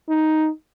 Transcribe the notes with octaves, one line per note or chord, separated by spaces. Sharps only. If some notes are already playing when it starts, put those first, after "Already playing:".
D#4